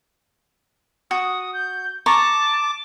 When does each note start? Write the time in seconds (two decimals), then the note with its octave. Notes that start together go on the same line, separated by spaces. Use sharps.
1.11 F#4 D#6
1.54 G6
2.06 A5 A#5 C#6 D6